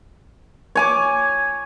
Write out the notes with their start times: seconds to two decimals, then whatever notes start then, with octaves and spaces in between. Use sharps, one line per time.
0.75 C#5 G#5 D6